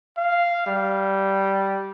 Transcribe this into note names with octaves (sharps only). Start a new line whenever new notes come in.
F5
G3